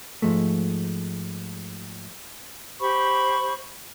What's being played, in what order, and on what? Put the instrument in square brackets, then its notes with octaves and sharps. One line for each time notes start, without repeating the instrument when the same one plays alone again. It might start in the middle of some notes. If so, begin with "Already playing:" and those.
[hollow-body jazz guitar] G#2 E3 F3 G#3 A3
[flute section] G4 C5 B5 C#6